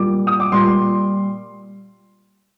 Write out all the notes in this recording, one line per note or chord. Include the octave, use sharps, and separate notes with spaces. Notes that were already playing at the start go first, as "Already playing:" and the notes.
Already playing: A#2 G3 D6
D#6
D6
A#2 G3 C6